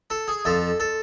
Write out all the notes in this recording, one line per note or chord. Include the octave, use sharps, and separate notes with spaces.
A4
G#4
F2 F3 A4
A4